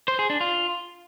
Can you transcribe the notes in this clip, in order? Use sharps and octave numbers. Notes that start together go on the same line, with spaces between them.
C5
G#4
D4
F4